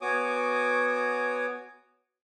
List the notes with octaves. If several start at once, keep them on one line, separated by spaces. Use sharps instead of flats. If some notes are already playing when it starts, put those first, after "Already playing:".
B3 F#4 C#5 G#5 D6 D#6